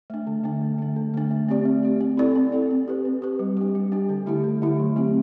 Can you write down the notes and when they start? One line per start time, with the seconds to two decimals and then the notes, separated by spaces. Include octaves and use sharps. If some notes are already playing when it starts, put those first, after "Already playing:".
0.10 A3 D4
0.27 D3
0.44 A3 D4
0.61 D3
0.78 A3 D4
0.96 D3
1.14 A3 D4
1.31 A3
1.49 C4 G4 D5
1.65 A3
1.83 C4 G4 D5
2.01 C4
2.17 E4 A4 D5
2.35 C4
2.52 E4 A4 D5
2.71 C4
2.88 G4 B4
3.05 C4
3.22 G4 B4
3.39 G3
3.57 D4 G4
3.75 G3
3.92 D4 G4
4.09 D3
4.26 A3 E4 G4
4.44 D3
4.62 A3 E4 G4
4.79 F#3
4.96 A3 C4 G4